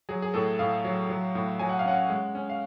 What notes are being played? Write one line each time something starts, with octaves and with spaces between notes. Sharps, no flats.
F#3 G#4
G#4
A2 A4
A2 F5
F#3
F#3
A2
F#3 G#5
F#5
F5
C#4 F#5
G#3
C#4
F5